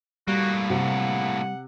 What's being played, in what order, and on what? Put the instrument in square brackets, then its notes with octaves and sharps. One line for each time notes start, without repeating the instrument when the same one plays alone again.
[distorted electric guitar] A2 A#3 [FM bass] G3 [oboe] F#4
[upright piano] C3 [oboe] F#5